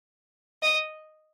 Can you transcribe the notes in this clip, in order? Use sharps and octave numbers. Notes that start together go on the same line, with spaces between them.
D#5